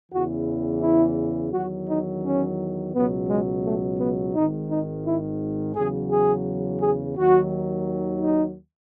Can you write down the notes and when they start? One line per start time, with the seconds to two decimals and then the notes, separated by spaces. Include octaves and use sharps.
0.12 E2 C#3 E3 F#4
0.82 E4
1.53 E2 D#3 F#3 F#4
1.88 D#4
2.23 C#4
2.94 C#2 B2 F#3 B3
3.29 G#3
3.65 A3
3.99 B3
4.34 G#1 G#2 D#3 D#4
4.70 D#4
5.05 E4
5.75 E2 C#3 F#3 G#4
6.11 G#4
6.81 G#4
7.16 D#2 D#3 F#3 F#4
8.22 D#4